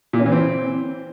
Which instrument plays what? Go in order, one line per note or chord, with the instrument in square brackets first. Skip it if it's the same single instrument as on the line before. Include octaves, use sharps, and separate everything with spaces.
[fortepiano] A#2
C#4
E3
C4